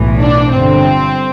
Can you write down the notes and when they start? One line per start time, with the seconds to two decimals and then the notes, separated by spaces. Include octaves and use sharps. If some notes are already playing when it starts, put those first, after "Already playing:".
Already playing: B1 A2 E3
0.20 D4
0.52 G1 G2 D3 C4